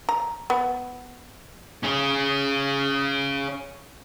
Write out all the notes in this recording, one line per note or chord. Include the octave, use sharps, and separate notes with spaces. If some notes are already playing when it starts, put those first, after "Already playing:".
A#5
B3
C#4 G#4